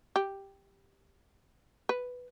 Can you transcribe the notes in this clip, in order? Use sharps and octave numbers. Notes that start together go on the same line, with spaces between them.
G4
B4